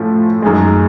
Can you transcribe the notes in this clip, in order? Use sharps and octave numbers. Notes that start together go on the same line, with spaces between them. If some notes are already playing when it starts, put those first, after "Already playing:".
Already playing: A2 F3 A3 C#4
F#2 D#3 G#3